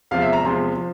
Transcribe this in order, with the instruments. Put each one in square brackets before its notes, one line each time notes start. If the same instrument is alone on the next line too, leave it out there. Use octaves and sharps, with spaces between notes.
[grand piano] E2 C3 F3 G#3 F5
E5
A#5
E2 C3 F3 G#3 C6
F3